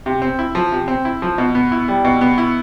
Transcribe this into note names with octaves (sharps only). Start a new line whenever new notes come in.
C3
C4
E4
F3
C3
C4
E4
F3
B2
B3
E4
G3
B2
B3
E4